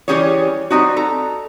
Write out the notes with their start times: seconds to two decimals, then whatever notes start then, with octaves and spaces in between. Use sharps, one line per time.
0.08 E3 G3 C#4 G4 G#4 C#5
0.70 G3 C4 D#4 F#4
0.96 A4 A#5